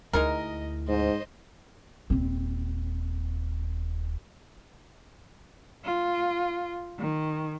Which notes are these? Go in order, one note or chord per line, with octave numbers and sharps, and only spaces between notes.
D2 G#3 D#4 E4 A#4 D#5
G#2 C5 D#5
D#1 C4
F4
D#3